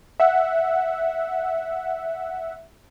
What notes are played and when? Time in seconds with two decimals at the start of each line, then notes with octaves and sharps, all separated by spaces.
0.20 E5 F#5